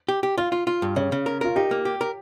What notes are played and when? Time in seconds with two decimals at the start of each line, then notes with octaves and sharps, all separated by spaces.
0.08 G4
0.23 G4
0.38 F4 F5
0.52 F4
0.67 F4
0.82 G2
0.96 C#3 C#5
1.12 C#3
1.26 A#4
1.41 F4 A#4
1.56 D#4 G4
1.71 A#3
1.85 G4
2.01 A#4